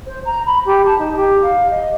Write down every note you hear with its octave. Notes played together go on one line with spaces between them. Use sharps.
C5
A#5
B5
G4
A5
D#4
G4
F5
D#5